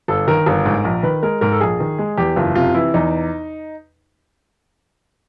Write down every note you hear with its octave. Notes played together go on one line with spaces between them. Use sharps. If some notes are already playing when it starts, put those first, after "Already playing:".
G1 A4
D#3 A#4
G1
G#2
A#1
D#3 B4
G#3 A#4
G#2 A#4
A4
A#1 G#4
D#3
G#3
E2 G4
F#1 F4
C3 F4
E3 E4
E2 D#4